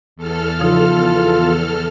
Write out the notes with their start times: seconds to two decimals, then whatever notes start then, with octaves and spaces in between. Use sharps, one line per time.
0.16 E2 A4 F6
0.60 C#3 F3 D#4 F4